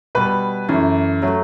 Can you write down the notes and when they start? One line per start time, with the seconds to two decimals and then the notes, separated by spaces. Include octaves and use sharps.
0.15 B2 G3 B4
0.69 F#2 E3 A3
1.22 F#3 A3